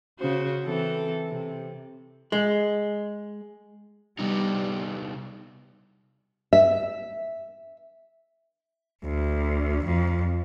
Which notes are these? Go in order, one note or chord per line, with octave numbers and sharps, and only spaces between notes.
C#3 F#4 C5
E3 C4 A4
C3
G#3
C3 G3 B3 D#4
E5
D2
F2